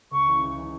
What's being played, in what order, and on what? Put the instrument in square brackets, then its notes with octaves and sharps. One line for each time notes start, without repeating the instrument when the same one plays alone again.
[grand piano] C#2 [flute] C#6
[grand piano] C#3 E3
C#2
C#3 E3